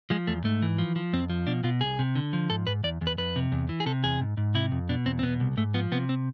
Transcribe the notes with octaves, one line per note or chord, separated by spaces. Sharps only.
F3 G#3
E2 A3
G#2 A3
E3
F3
F3
F2 C4
F3
B2 D4
B2 F4
C2 G#4
C3
D3
F3
G#2 A4
G#2 B4
E2 D5
E2
B4
F2 B4
C3
E2
E3
G#4
C3 A4
E2 G#4
G#2
G#2
C3 E4
F2
B2 D4
E2 C4
C4
B2 B3
C2
G#2 A3
F3 B3
C3 B3
C4